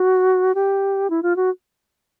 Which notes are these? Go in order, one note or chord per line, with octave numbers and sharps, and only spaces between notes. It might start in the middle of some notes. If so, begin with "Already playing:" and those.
Already playing: F#4
G4
E4
F4
F#4